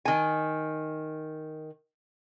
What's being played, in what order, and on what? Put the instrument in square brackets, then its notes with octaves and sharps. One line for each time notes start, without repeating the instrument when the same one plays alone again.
[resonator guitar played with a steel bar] D#3 G#5